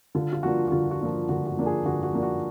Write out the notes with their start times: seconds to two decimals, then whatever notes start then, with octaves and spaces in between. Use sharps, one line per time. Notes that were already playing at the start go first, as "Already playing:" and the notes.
0.15 D3 F4
0.33 F4
0.43 F3 A#3 D4 F#4
0.68 F#4
0.72 D3 F4
0.91 F#4
1.01 F3 A#3 D4
1.29 D3 F#4
1.47 F#4
1.57 F3 A#3 D4
1.66 G#4
1.85 D3 F#4
2.03 F#4
2.13 F3 A#3 D4
2.23 F#4